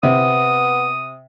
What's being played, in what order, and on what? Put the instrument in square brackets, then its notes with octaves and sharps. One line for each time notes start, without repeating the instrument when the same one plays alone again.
[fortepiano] C3 [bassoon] B3 [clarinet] D#6